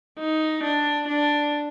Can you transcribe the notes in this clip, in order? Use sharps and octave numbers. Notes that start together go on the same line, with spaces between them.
D#4
D4
D4